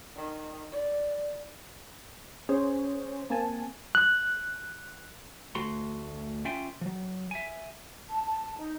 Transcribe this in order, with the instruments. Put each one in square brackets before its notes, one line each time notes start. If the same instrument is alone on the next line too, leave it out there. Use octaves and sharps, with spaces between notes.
[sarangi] D#3
D5
[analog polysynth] C#4 G#4 C5 C#5
A#3 C4 G#5 A5
[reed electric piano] F#6
[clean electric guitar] D2 A3 F#4 C6
C#4 F4 E5 G5 G#5 C6
F3 F#3
E5 G#5
[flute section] A5
A5
D#4